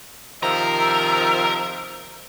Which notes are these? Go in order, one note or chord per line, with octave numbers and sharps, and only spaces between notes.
C3 D#3 F3 A#4 E5